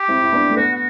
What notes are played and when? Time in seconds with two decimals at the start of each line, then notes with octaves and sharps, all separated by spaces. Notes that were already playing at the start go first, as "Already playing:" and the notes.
Already playing: G4
0.08 C4 E4
0.22 E4
0.33 B3 D4
0.50 A3
0.56 B3 F#4
0.73 F#4